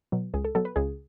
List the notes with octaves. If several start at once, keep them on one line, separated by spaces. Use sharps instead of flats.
B2 F#3
C#2 G#4
A4
B2 F#3 A4
B4
C#2 G#4